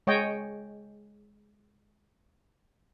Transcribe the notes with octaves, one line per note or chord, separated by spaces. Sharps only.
G#3 C#5 D#5 G5